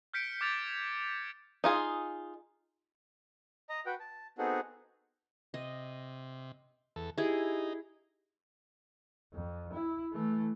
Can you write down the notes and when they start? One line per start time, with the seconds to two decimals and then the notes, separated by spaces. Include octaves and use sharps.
0.14 F6 G6 B6 C#7 D7
0.41 D6 F6 G#6 A6 F7
1.64 D#4 F4 G#4
3.69 D#5 A#5
3.86 F#4 B4 G5
4.00 A5
4.38 B3 C4 D#4 F#4 G#4 A4
5.54 C3 D#5
6.96 E2 A4
7.18 D#4 E4 G4 G#4
9.33 F2
9.73 E4
10.12 E3 A3